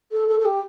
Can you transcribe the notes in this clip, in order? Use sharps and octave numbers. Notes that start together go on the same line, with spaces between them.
A4
A4
A4
G4